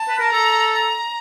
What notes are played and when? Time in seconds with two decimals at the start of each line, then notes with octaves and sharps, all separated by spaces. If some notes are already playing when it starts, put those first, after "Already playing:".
Already playing: A5
0.09 B4
0.19 A#4
0.32 A4 A#5
0.72 A#5